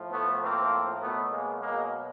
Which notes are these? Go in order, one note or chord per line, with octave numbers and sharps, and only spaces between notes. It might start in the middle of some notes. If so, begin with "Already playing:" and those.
Already playing: A2 F3
A3 B3
A#3 C4
B2 F#3 A3 B3
G#3 A#3
G#3 A#3